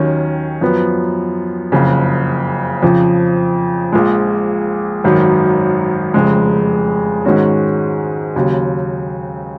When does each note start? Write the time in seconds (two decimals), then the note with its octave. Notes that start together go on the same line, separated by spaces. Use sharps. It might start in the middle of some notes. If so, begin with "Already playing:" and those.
Already playing: D#2 D#3 F#3 C#4
0.61 F#2 F3 B3
1.72 F#1 F2 C#3
2.83 F2 C#3 F3
3.92 A#1 A#2 G#3
5.04 G#1 F#2 D#3 F#3
6.14 F1 F2 C#3 G#3
7.25 G#2 D#3 G#3 C#4 F#4
8.36 D#2 C#3 F#3